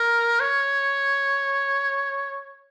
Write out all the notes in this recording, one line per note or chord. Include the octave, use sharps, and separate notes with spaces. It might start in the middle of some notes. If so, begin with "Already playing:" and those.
Already playing: A#4
C#5